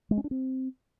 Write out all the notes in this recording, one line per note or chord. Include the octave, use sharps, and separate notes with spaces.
G#3
C#4
D4
C4